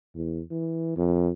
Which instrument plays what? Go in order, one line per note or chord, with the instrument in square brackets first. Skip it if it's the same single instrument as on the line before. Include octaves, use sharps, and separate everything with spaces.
[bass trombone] E2
E3
F2